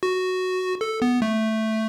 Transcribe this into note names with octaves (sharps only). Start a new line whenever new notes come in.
F#4
A4
B3
A3